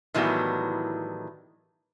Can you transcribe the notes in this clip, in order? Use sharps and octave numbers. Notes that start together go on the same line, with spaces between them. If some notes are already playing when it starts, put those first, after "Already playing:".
A2 D#3 E3 F#3 G3 B3